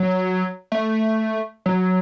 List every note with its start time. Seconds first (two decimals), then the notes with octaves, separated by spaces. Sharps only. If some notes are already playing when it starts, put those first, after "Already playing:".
Already playing: F#3
0.72 A3
1.66 F#3